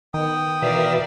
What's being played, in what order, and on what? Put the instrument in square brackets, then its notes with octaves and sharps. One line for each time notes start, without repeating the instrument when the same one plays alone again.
[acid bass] D#3 [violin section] B3 [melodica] G5 D#6
[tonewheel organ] B2 E3 E5 [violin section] A#4 D5 F5